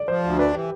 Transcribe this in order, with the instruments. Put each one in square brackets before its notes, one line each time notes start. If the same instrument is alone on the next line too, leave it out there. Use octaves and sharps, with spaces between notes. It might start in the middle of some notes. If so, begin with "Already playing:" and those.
Already playing: [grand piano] D5
[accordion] F3 [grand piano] C5
[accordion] D2
[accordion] D4 [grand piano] B4
[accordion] E3 [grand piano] G4